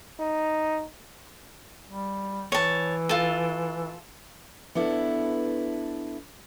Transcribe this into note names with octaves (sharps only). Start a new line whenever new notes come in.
D#4
G3
E3 C#5 A5
F4 A4
B3 D4 E4 A4